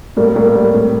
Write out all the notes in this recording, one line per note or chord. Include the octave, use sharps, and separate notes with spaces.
A2 G3 A#3
A2 G3 A#3
A2 G3 A#3
A2